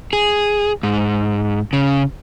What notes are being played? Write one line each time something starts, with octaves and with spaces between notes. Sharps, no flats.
G#4
G#2
C#3